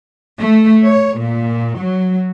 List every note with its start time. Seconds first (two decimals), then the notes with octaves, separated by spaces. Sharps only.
0.40 A3
0.85 C#5
1.19 A#2
1.81 F#3